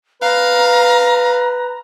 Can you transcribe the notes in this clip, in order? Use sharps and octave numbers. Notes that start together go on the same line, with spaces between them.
B4 F5 A#5